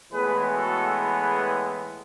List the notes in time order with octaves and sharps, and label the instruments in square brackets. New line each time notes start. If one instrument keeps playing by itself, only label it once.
[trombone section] A2 E3 G#3 B3 G#4 B4
F#4 A4
G#4 B4